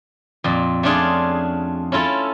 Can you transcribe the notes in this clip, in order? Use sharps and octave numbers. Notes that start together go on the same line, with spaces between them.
F2 A#2
A3 C#4 D4 F4 G#4
C#4 E4 F4 A4